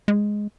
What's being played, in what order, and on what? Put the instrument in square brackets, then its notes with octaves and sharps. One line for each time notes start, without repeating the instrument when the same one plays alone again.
[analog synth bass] G#3